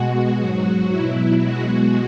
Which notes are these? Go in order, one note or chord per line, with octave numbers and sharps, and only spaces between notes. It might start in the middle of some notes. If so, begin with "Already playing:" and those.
Already playing: B2 G#3 F#4
G#2 F#3
B2 F#3 E4
B2 G#3 F#4